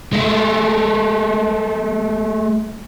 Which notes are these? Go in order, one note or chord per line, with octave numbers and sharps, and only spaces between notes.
G#3 A3